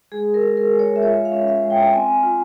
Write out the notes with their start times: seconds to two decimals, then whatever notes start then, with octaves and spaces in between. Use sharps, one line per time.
0.12 G#3 G#4
0.34 A#4
0.42 G#3
0.57 A#4
0.73 G#3
0.79 C#5
0.96 E5
1.02 F4 C#5
1.25 F5
1.32 C#4
1.48 E5
1.63 G#3
1.70 G5
1.93 C4 G#5
2.23 F4